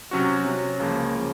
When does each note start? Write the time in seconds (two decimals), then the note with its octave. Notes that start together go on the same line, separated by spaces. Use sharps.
0.11 C3 F#3 C#4 F#4
0.45 C3 F#3 C#4 F#4
0.79 C#2 C#3 F3 A#3
1.14 C#3 F3 A#3